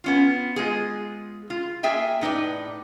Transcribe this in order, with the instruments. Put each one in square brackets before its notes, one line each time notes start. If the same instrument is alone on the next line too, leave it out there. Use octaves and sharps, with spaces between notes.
[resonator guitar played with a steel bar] B3 C#4 F4
G#3 F4 G#4
F4
A#3 G#4 E5 G5 G#5
A2 D#4 B4 D5